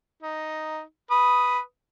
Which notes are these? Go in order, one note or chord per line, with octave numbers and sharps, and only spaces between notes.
D#4
B4 D#6